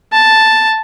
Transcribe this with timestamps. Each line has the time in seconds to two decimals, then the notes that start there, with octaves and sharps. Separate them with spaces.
0.13 A5